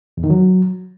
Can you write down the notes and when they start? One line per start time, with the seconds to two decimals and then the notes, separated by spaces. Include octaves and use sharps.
0.17 E2
0.24 D#3
0.30 F#3